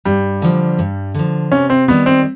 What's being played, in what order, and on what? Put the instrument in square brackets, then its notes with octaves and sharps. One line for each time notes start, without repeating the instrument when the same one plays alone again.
[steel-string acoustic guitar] G2 [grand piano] G3
[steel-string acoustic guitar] D3 F3
G2
D3 F3
[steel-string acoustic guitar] C3 [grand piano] C#4
[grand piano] C4
[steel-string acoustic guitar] D#3 G3 [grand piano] B3
[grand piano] C4